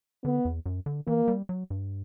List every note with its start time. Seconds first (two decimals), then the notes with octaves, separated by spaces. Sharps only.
0.25 D3 B3
0.45 E2
0.66 F#2
0.86 D3
1.07 E3 A#3
1.28 G3
1.49 F#3
1.70 G2